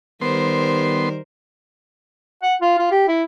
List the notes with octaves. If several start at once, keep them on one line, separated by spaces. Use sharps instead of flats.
D#3 G3 B3 A#4 C5 C6
F#5
F4
F4
G4
E4